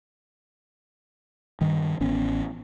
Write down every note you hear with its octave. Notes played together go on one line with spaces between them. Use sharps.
G2 D#3
A1 B3 C#4